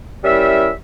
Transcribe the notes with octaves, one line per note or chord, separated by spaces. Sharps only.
G3 C#4 E4 A#4 E5